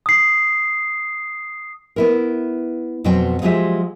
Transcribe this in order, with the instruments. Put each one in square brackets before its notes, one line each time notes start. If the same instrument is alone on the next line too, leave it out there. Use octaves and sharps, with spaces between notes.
[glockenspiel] D#6 C7
[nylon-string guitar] B3 E4 A#4
F2 B2 F#3 F#4 C5 G5
F3 F#3 G#3 F4 G4 E5